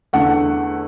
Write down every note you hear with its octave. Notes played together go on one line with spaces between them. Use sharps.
E2 D3 A3 F#5